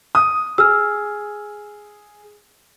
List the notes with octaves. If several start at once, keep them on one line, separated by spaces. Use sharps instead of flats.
D#6
G#4 E6 F6